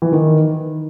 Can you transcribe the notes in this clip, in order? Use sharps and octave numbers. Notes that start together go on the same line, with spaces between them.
E3
D#3